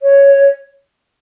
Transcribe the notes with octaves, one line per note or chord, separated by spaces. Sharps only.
C#5